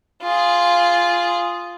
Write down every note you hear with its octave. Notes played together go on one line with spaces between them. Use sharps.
F4 G#4